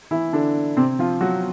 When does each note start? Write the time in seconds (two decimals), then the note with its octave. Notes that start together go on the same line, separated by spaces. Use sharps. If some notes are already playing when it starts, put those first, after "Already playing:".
0.11 E3 E4
0.33 D3 D4
0.77 C3 C4
0.99 F3 F4
1.21 F#3 F#4